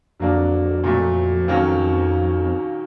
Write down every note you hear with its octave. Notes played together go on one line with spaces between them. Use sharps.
F2 D3 F#3 A#3 D4
A#2 F#3 A3
D#2 D#3 F#3 A#3 C#4